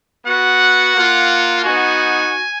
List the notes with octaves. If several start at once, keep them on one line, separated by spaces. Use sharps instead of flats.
B3 F#4 F#5
A#3 F4
B3 D#4 F#4 G#5